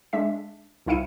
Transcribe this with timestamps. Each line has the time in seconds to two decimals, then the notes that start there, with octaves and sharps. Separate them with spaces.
0.13 G#3 D4 E5 B6
0.86 C2 D#4 E4 F5 C#7 D#7